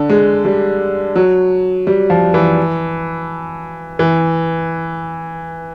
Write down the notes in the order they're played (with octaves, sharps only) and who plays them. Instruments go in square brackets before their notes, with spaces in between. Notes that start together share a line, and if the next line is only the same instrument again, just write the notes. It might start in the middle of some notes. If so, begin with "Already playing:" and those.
Already playing: [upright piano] D3
G#3
G3
F#3
G3
F3
E3
E3